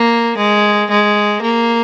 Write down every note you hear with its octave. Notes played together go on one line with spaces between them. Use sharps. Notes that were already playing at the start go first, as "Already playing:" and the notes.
Already playing: A#3
G#3
G#3
A#3